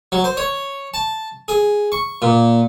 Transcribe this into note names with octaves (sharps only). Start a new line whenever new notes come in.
F#3
C5
C#5
A5
G#4
C#6
A#2